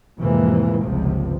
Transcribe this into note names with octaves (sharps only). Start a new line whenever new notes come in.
F2 A2 C3 E3 G#3 A#3
G1 C#2 C3 F3